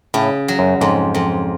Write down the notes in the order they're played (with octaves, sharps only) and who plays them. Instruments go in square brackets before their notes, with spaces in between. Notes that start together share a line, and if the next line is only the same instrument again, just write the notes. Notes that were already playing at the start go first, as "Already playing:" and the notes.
[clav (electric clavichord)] A2 [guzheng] C#3
[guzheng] F#3
[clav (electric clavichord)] F#2
[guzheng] F2 [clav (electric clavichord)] G#2
[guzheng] F2